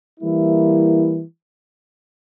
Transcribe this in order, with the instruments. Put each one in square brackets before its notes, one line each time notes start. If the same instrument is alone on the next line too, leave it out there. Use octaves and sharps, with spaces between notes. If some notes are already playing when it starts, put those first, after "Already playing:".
[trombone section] E3 G3 A#3 E4